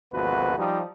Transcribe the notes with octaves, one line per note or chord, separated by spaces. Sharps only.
G#1 D2 B2 F3 F#4 B4
F3 G3 D#4